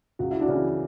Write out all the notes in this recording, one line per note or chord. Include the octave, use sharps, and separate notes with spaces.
C#2 F#4
E4
D4 F#4
C#3 E3